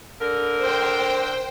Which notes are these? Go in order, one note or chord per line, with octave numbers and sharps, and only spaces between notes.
D3 A#4
C5 G5